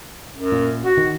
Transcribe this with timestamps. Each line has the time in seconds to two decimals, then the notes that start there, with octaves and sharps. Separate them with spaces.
0.36 F#2
0.52 A#2
0.85 F#4
0.97 D#3